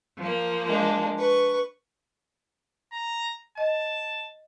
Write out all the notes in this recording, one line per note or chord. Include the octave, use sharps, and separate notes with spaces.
F3 A#3
G#3 D4
B4 C#6
A#5
D#5 A5